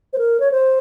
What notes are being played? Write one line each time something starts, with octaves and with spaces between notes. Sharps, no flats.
C5
A#4
C#5
C5